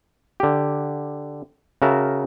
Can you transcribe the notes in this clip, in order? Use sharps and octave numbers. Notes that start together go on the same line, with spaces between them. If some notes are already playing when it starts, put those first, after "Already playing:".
D3 G4
C#3 F#4 A#4 E5 A5